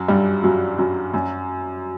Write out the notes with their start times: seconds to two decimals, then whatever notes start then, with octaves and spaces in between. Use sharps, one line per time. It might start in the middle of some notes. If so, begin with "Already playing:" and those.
Already playing: F#2 F#3
0.08 G2 G3
0.43 F#2 F#3
0.78 F#2 F#3
1.14 F#2 F#3